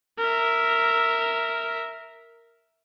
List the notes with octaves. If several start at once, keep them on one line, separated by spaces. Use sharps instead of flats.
A#4 E5